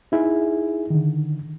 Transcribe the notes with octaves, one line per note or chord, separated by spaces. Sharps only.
D#4 E4 G#4
D3 D#3